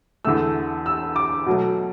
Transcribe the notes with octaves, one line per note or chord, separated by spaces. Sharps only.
E2 D3 A3 E6
E6
D6
B2 F#3 A3